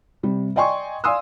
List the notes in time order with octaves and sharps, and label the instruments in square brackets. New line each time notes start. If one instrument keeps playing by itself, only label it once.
[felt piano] C3 G3
D5 D#5 G5 G#5 C6 C#6
D5 F5 G#5 C6 D#6 E6